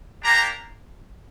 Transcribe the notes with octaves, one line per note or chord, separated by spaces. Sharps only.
A#3 D4 G4 A#5